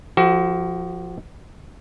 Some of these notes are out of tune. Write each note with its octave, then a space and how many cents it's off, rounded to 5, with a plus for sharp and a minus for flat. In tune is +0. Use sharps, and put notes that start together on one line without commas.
F3 +0 F#4 +35 A4 +0